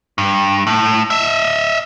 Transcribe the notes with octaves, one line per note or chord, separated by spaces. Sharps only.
G2
A2
D#5 E5